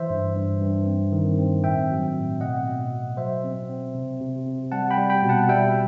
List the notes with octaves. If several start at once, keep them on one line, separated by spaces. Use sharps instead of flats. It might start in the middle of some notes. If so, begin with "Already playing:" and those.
Already playing: E3 C5 E5
G2
G2
G2
C4
D#3
C4
A2 E5 G5
F#3
A2
B2 D#5 F#5
B2
B2
F#3 C5 E5
C4
C4
C3
C3
C3
G3 F#5 A5
G5 B5
G3
G5 B5
B2
F#5 A5
G3 E5 G5